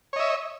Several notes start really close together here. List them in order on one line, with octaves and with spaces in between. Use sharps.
C#5 D#5 E5